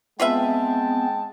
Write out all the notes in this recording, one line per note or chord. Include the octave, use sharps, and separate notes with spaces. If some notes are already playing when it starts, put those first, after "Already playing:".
G#3 B3 C4 F4 B4 E5 G5 A5